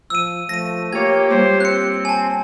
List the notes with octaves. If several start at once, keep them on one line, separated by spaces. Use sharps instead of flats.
F3 E6 D#7
F3 A3 A#6 D#7
A#3 F4 G4 C#5 G#6
G3 A#3 C5
C4 F#6 C#7
G#5 A5